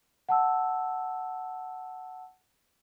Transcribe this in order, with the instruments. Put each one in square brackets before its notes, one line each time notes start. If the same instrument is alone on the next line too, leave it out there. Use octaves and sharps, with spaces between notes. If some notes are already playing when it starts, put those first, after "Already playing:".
[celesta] F#5 A5 E6